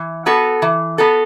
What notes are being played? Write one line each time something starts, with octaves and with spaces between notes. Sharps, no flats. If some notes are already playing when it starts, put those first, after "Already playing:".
Already playing: E3
B3 F#4 A4
E3
B3 F#4 A4